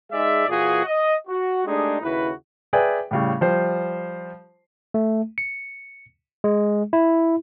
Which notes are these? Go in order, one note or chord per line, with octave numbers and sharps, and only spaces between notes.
G#3 D#4 G#4 D5 E5
A#2 E3 F4 F#4 G#4
D#5
F#4
G#3 A3 D4 D#4 G4 G#4
D#2 C#3 E4 F#4 B4
G#4 B4 D5 E5 G5 G#5
A2 C#3 G3
F3 G3 C5
A3
C#7
G#3
E4